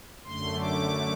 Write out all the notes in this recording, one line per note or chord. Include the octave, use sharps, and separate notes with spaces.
F#2 D3 A3 C6
D6